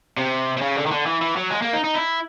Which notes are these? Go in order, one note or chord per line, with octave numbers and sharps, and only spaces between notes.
C3
C3
C#3
D3
D#3
D3
E3
E3
F#3
G#3
A#3
D#4
D#4
E4